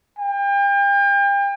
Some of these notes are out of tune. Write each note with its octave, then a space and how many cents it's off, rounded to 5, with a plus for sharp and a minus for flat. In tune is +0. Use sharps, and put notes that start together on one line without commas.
G5 +35